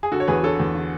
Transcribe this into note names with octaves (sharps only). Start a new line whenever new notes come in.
G#4
D3 F#4 A4
C#5
E2 G#4 B4
D3 A4 C#5
E2
D3